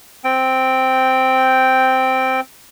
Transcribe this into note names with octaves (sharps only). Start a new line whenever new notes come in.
C4 G5